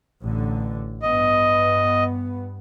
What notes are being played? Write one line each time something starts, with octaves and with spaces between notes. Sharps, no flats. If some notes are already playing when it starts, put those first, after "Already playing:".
A1 D3
G2 B3 D#5